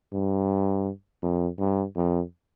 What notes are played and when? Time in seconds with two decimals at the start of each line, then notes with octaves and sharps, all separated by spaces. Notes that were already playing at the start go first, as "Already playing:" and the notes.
0.12 G2
1.22 F2
1.59 G2
1.96 F2